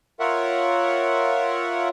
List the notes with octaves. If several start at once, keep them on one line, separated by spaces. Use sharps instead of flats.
F4 A#4 C#5 E5 F#5